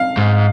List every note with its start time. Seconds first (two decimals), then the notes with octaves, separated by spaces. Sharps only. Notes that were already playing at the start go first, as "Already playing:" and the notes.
Already playing: F5
0.17 G#2